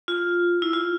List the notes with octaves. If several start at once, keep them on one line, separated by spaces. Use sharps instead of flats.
F4
E4
F4